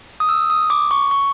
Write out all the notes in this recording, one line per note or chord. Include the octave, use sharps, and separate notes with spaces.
D#6
E6
D#6
D6
C#6
C#6